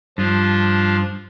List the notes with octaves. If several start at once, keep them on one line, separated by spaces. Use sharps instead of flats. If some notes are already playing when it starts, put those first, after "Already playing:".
G2 F3 D4 F4